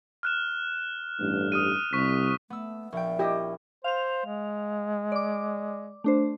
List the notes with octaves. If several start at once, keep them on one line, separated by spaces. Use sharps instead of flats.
F6 F#6 E7
A1 G2
D#6 F6 D#7
C2 C#6 B6
A3 B3 E6
A#1 E5 G5
E4 G4 D#5
C5 F5 F7
G#3
D5 D6
A3 D4 C5